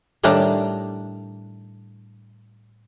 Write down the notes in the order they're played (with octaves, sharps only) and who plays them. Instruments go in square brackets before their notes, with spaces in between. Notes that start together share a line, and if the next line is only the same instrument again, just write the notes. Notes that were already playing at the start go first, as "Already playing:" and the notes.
[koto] A2 D#3 G3 D4 A5 A#5